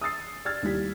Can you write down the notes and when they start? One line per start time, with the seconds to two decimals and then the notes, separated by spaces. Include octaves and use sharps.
0.01 D#6 E6 A6 C7
0.45 D5 E6 F6 G#6 A6
0.63 D#2 G3 E4 G4 B6